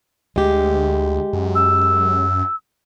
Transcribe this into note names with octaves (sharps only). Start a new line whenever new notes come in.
D2 G#3 G4
F#2
E6